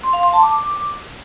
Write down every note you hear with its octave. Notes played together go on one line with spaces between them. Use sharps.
C6
F5
C6
A5
D6